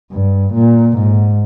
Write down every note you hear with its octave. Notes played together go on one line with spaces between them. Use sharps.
G2
A#2
G#2